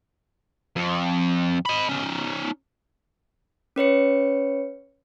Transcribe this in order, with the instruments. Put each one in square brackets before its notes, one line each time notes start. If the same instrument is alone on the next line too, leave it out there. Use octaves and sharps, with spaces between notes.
[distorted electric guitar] F2
D#5 B5
C#4 D#4
[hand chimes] C#4 B4 C#5 C#7